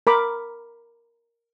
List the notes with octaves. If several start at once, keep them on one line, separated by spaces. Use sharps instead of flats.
A#4 B5 D6